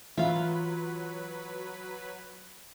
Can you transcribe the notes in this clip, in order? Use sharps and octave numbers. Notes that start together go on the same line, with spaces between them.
E3 F#3 F4 B4 E5 F5